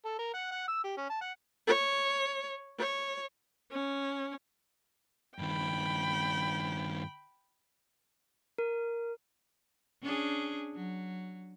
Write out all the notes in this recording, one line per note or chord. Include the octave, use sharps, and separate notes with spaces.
A4
A#4
F#5
F#5
E6
G4
C#4
A5
F#5
C#5
C#5
C#4
G2 D#3 G5 B5
A#4
C#4 D4 G#4
F#3